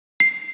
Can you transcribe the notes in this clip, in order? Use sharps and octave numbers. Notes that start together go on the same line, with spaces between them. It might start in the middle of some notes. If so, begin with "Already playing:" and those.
C7